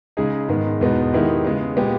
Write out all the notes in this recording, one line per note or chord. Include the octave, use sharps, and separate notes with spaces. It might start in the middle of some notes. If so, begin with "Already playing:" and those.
C#3 G#3 D#4 G#4
G#2 D#3 G#3 B3
E2 B2 G#3 B3 D#4
D#3 G#3 B3 E4 G4
C#3 G#3 B3
A#2 G#3 B3 G4